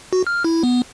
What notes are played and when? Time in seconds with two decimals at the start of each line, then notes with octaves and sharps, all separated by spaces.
0.13 F#4
0.27 F6
0.44 E4
0.63 B3